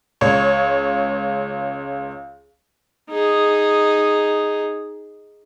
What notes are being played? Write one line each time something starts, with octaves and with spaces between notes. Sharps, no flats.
C#2 C#5
D#4 G#4